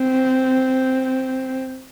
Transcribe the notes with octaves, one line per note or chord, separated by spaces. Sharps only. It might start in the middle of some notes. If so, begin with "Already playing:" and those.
Already playing: C4